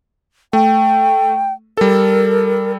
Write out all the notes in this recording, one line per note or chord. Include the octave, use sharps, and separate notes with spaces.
A3 G5
G3 A4 A#4